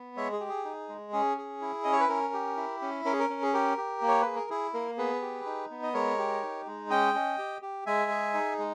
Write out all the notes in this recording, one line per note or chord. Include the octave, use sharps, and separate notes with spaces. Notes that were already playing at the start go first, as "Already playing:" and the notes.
Already playing: B3
G#3 C#5 E5
G#4
G4
G#4
D#4
G#3
C#4 G#4
G#4
E4
C#4 D#5
C#5
B4
C#4 A#4
G4
E4
C#4
C#4 A#4
G#4
A#4
C#4
G#4
G4 A#4
G4
A#3
C#5
G#4 B4
A#4
E4 G#4
A#3 A#4
B3 G#4 B4
G4
D#4
B3
D#5
G#3 A#4 C#5
G4
D#4
G#3
C#4 D#5 G5
C#4
G4
G4
G#3 E5 G#5
G#4
D#4
G#3